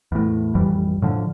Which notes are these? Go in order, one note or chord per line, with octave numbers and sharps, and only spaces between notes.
E2 A2
A1 F2 E3 G3
A2 D3 F3